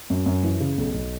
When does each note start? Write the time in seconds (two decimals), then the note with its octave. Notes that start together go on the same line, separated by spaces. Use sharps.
0.10 F#2
0.26 F#2
0.43 E3
0.60 C#3
0.78 B1
0.94 B1